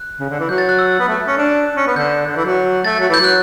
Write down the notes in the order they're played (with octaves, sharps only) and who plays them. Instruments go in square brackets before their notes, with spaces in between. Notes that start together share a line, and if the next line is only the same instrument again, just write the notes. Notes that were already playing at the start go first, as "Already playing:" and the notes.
Already playing: [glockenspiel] F#6
[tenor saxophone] C#3
D3
E3
[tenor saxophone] F#3 [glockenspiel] G6
[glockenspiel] A6
F#6
E6
[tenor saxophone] B3
A3
C#4
D4
C#4
B3
[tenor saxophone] D3 [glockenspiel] G6
[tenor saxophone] D3
E3
F#3
[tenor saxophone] A3 [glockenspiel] A6
[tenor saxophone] F#3
[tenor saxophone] E3 [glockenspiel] G6
[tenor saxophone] F#3 [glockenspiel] F#6